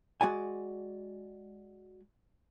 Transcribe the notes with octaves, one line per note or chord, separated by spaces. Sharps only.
G#3 F#4 D5 G#5